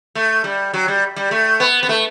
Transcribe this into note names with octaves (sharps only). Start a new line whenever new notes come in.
A3
G3
F#3
G3
G3
A3
B3
B3
A3